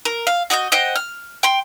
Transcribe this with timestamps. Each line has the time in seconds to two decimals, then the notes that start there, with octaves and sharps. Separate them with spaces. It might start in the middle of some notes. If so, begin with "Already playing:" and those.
0.05 A#4
0.27 F5
0.50 F#4 D#5 E5 G6
0.72 C5 D#5 F#5 G5
0.96 F6
1.43 G5 C6